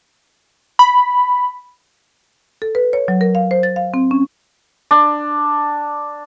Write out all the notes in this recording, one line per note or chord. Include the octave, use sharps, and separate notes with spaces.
B5
A4
B4
C#5
F#3
A#4
F5
C5
A6
F5
C4
C#4
D4